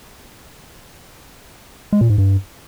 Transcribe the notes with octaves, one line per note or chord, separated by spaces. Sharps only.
G#3
A#2
G#2
G2